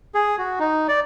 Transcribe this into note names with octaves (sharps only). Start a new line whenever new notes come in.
G#4
F#4
D#4
D5